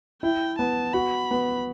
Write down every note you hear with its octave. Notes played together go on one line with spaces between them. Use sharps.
E4 G5
B3 A5
F#4 B5
B3